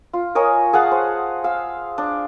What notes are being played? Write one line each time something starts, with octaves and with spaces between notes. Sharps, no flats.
F4
A#4 C#5 D#5 G#5
G#4 F5 F#5 A5
C5
F5 E6
D4